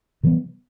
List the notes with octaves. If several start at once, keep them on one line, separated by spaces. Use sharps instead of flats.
C3 E3 G3 B3